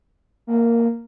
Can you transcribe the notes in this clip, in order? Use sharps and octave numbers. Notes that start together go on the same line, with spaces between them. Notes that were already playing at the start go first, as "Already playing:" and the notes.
A#3